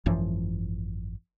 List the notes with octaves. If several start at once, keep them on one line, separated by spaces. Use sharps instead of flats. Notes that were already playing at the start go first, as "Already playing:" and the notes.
G#1 F#2 E3 F3